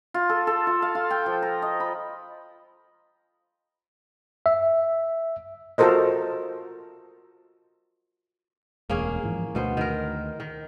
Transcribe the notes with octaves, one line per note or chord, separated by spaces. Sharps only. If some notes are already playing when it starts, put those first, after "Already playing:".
F4
A4
A4
F4
F5
F4
G5
F3
A#5
D#5
B5
E5
F4 F#4 A4 A#4 C5 D#5
E1 D2 A#3 C#4 G#4
G#2 E3 F3
D2 B2 B3 C5
D#3 A#4
D#3